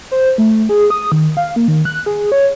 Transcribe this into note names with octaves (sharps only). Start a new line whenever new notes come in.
C5
A3
G#4
D#6
D#3
F5
A#3
D#3
F#6
G#4
C#5